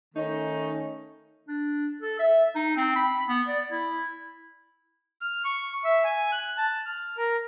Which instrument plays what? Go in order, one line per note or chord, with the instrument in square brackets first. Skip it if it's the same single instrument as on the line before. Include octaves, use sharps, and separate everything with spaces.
[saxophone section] D#3 A3 C#4 D#4
[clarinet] D4
A4
E5
D#4
C4
B5
B3
D5
E4
[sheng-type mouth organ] F6
C#6
E5
G#5
F#6
A5
F6
A#4